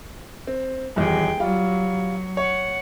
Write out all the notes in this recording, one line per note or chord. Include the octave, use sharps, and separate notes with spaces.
C4
D#1 E2 G#4 G5
F#3 G3 F4
C#5 F#5